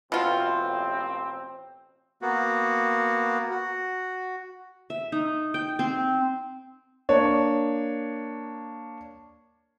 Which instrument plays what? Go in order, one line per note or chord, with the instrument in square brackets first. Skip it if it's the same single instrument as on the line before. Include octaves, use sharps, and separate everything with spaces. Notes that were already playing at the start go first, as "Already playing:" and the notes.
[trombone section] A1 C4 [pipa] B2 F4
[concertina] A#3 B3 F#4
F#4
[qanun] E5
D#4
G5
C4
[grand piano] A#3 D4 C#5